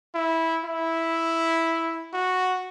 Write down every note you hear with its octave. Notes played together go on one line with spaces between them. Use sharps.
E4
E4
F#4